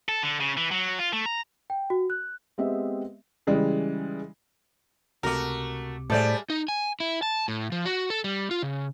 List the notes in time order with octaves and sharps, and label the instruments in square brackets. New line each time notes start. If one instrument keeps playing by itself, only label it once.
[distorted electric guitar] A4
D3
C#3
E3
F#3
F4
A3
A#5
[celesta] G5
F#4
F#6
[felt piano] G#3 B3 C4 G4 D#5 E5
[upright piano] C#3 E3 G3 G#3
[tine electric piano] C#2 C3 D6 [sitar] A3 F#4 [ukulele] A#4
[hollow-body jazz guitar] A2 [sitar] G3 G#3 [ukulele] A4 C5 D5
[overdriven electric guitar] D#4
G#5
E4
A5
A2
F3
F#4
A4
G3
F4
C#3